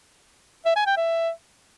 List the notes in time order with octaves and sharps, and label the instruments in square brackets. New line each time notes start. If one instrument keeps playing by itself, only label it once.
[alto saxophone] E5
G#5
G5
E5